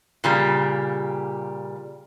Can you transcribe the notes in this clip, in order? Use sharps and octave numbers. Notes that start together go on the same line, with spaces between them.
A#2 C#3 G3